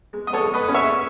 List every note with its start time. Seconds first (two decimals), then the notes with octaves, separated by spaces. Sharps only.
0.13 G#3
0.27 D#5
0.33 A4 C#5
0.40 G#3
0.54 B4 D#5
0.68 C#4
0.74 C#5 E5